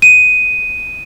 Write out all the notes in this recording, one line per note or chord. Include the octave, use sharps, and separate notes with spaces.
D#7